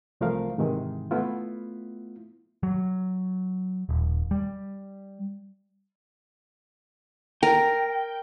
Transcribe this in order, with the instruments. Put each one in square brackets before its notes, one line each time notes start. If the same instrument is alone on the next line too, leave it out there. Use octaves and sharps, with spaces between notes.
[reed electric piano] C2 E3 F3 A3 A#4 F5
G#2 C3 D#3 E3 G#3
A3 B3 E4 F4
[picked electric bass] F#3
D#1
G3
[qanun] A#4 [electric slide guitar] G5